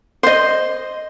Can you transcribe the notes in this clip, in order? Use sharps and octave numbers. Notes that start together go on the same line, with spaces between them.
C5 D#5